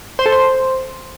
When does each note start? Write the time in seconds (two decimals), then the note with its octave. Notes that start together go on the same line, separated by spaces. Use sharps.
0.19 C5
0.26 A4
0.32 C5